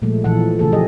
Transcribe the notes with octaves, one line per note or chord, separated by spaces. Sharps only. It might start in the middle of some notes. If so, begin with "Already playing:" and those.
A#2 F3 G#3 A3
A#2 E3 F3 A4 F#5
C#3 E3 A3 G#4 A4
A#2 F3 G4 G#4 D#5